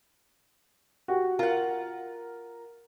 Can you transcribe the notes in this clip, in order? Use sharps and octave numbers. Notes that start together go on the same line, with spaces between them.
F#4 G4
F4 A#4 F#5